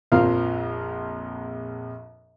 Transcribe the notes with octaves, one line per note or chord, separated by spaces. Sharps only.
A#1 F2 F3 A#4 F5